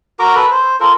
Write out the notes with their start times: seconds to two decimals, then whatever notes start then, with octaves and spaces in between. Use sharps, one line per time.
0.19 F#4 A#4 A#5 D6
0.35 A4 B4 B5
0.51 C5
0.80 F4 A4 A#4